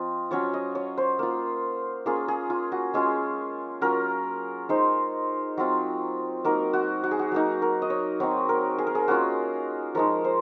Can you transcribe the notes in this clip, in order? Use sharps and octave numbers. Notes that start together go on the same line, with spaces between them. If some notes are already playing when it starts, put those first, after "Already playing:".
Already playing: F3 C4 F4 D#5
F#3 C#4 F4 C#5
D#5
C#5
C5
A#3 F4
A#3 C#4 F4 G#4
G#4
F4
F#4
G#3 C#4 F4 G#4
F#3 C#4 F4 A#4
G#3 D#4 C5
F#3 C4 F4
F#3 A#3 D#4 A#4
F#4
F#4
G#4
F#4
F#3 A#3 D#4
A#4
D#5
C#5
F#3 C4 D#4 C#5
A#4
G#4
A#4
G#4
A#3 C#4 F4 F#4
F3 G#3 D#4 A#4
C5